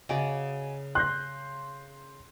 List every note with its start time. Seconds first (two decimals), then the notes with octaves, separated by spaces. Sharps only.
0.09 C#3 F#4 D5 D#5 G#5 A#5
0.95 C6 F#6 G6 A#6